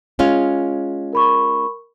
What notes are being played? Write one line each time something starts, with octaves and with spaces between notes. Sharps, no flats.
G#3 C#4 F4
A#4 B5 C#6